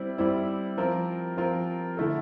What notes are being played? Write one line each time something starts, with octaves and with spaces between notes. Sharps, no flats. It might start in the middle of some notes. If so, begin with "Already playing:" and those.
Already playing: G3 C4 E4
G3 C4 E4
F3 C4 F4 A#4
F3 C4 F4 A#4
D3 A3 E4 A4